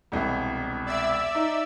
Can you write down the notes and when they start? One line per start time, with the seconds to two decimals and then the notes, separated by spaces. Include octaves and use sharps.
0.12 E1 C2
0.86 D5 E5 E6
1.35 D#4